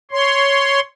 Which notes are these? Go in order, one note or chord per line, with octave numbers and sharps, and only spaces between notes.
C#5 C6